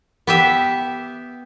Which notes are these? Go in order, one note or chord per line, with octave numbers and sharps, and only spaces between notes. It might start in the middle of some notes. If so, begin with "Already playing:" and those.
B3 G4 E5